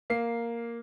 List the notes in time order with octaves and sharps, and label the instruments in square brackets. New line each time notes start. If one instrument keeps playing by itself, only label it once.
[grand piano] A#3 C7